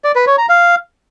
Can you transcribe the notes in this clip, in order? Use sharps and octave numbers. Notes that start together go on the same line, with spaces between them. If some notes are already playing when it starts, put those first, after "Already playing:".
D5
B4
C#5
A#5
F5